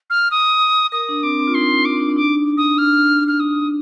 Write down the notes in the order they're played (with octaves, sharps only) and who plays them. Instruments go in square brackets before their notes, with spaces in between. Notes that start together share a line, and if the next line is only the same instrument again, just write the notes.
[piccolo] F6
D#6
[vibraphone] A#4 [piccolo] D#6
[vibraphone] D4
[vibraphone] C4 [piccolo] D6
[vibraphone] C4
F4
[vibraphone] D#4 [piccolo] C6
[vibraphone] D#4
[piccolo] D6
[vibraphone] D4
D4
[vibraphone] D#4 [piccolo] D6
[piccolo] D#6
[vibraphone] D4 [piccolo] F6
[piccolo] F6
D#6